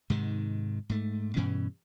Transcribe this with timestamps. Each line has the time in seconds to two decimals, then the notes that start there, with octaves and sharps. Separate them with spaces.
0.10 G#2 C3 D#3
0.89 G#2 A3
1.36 G2 B2 E3 C#4